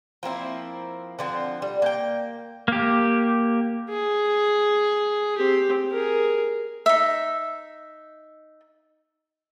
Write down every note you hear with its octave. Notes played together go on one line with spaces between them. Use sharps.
F3 A#3 C4 E4
D3 F3 C4
G3
A#3 G5
A#3 G4
G#4
C4 G4
G#4 A#4
D#4 E5